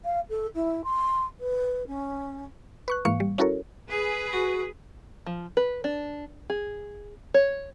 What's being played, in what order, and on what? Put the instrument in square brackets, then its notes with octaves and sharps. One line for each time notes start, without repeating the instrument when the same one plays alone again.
[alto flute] F5
A4
E4
C6
B4
C#4
[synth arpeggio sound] B4 C#6 F#6
G#2 E3 A#3 F5 C#6 C#7
G3
C#4 E4 F#4 A4 A#4 C#5
[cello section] G#4 B4
[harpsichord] F#4
[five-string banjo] F3
B4
D4
G#4
C#5